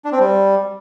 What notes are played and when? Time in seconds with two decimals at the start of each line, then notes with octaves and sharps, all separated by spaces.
0.05 D4
0.12 C4
0.20 G3